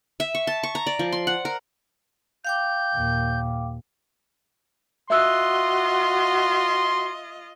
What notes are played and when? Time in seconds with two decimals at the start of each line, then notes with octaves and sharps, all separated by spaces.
0.20 E5
0.35 C#6
0.47 A5
0.63 C#6
0.75 A#5
0.87 D5
0.99 F3
1.12 C6
1.27 F#5
1.45 A#4
2.45 F5 G5 D6 G6
2.95 D#2 A#2
5.10 F4 F#4 D#5 E5 C6 E6 F#6